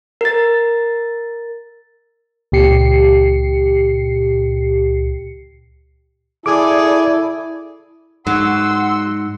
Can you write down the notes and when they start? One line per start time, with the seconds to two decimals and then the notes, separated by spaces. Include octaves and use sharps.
0.21 A#4 A6
2.52 C#2 A#2 G4 C7 C#7
6.46 E4 G#4 A4 D5 D6 D#6
8.27 G#2 F#3 F#5 C6 E6